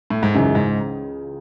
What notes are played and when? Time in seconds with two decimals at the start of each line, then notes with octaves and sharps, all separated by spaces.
0.10 A2
0.23 G#2
0.34 C#2 F#2 C#3 E3 G#3 D#4
0.55 G#2